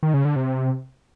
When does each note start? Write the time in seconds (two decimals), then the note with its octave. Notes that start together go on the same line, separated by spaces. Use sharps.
0.03 D#3
0.14 C#3
0.25 D3
0.36 C3